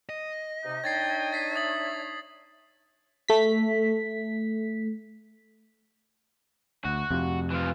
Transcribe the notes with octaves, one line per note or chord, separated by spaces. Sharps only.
D#5
C3 D#4
D4 D#4 C#5 G5 G#6 A6 C7
A6 B6 C7
E5 D#6 A6 F#7
A3 B6
D2 F#4
F2 C3
E3 F4